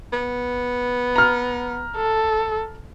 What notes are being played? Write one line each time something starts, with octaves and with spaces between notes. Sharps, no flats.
B3
A#5 F6
A4